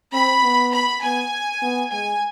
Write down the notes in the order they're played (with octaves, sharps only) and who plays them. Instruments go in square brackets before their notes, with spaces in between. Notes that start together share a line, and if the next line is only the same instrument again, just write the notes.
[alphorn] C4 [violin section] B5
[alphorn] B3
[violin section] B5
[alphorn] B3 [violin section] G#5
[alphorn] B3
[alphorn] G#3 [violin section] G#5